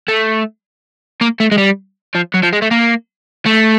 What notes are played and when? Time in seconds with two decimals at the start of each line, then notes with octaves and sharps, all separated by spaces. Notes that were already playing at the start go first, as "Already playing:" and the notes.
0.08 A3
1.21 A#3
1.40 A3
1.52 G#3
1.58 G3
2.15 F3
2.34 F#3
2.43 F3
2.53 G#3
2.62 A3
2.71 A#3
3.46 A3